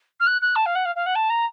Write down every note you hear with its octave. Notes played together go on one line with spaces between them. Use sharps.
F6
F#6
F#6
A5
F5
F#5
F5
F5
F#5
A5
A#5